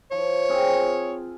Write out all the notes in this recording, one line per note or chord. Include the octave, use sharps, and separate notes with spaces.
F3 C#5
C4 F4 G#4